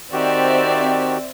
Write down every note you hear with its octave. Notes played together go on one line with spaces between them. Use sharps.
D#3 C4 F#4 G4 D5 E5